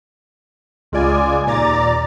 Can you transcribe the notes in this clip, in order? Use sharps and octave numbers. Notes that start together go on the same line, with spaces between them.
C#2 G#3 F4 D5 G#5
D#2 A#2 D5 A#5 A6